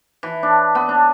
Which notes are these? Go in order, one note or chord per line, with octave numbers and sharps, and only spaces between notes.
E3
D4
B3
D4